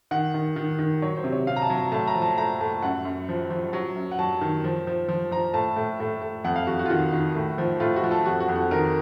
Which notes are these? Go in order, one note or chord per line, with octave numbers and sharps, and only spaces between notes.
D#3 F#5
D#3
D#3
D#3
F#3 C#5
C5
C3
C#5
C3 F5
A#5
A5
F#3
A#5
A2 A5
A#5
F3
A5
A2 A#5
A2 A5
F#2 F#5
F#2
F3
F3
F#3
F#2
F#5
F#3 A5
D#3
F3
F3
F3
F3 A#5
A2 A5
A2
A2
A2
F2 F#5
F5
F2 F#4
F#4
F4
D#3 F#4
D#3
A2
F3
A2 F4
F#4
F3
A4
F2 F#4
F#4
F2
F#4
D#3 A#4